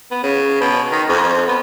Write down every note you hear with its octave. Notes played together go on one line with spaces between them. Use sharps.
B3
C#3
B2
D#3
F2
B3